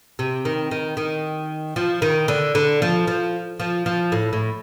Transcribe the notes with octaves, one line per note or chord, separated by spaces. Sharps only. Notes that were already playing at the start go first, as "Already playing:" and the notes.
C3
D#3
D#3
D#3
F3
D#3
D3
D3
F3
F3
F3
F3
A2
A2